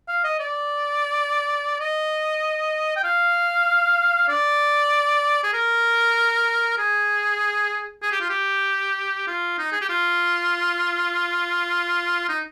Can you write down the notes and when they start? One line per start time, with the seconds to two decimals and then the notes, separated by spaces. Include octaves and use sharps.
0.08 F5
0.24 D#5
0.40 D5
1.79 D#5
2.96 G5
3.04 F5
4.29 D5
5.43 G#4
5.53 A#4
6.78 G#4
8.03 G#4
8.12 G4
8.21 F4
8.30 G4
9.27 F4
9.58 D#4
9.72 G#4
9.81 G4
9.89 F4
12.29 D#4